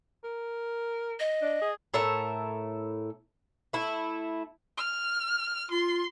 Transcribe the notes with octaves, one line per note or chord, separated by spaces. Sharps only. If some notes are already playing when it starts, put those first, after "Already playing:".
A#4
D#5
D4
G#4
A2 A4 A#4 E5
A3 E4
F6
F4 C6